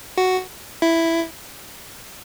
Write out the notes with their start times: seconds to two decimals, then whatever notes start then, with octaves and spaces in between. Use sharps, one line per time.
0.17 F#4
0.82 E4